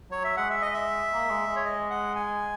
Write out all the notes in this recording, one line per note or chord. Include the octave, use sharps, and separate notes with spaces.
F#3 C#5
E5
G#3 F#5
E5
D#5
E5
A#3
G#3
G#3
C#5
D#5
F#5
G#5